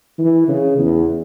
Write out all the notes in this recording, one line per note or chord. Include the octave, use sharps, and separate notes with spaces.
E3
C#3
E2